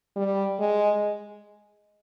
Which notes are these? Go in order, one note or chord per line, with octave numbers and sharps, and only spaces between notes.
G3
G#3